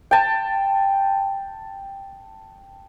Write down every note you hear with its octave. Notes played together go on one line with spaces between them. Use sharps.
G5 A5